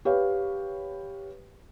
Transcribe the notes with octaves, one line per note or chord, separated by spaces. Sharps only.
G4 B4 C#5 F5